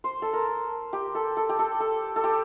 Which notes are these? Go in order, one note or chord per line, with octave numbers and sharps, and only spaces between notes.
C5
A4
A#4
G4
A4
A4
G4
A4
A4
A4
G4